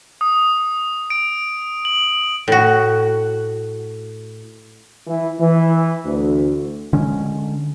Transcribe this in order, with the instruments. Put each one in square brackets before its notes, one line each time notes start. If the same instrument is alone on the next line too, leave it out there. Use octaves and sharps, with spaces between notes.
[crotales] D#6
D7
F#7
[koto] A2 F#4
[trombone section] E3
E3
D2
[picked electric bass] D3 G#3 C#4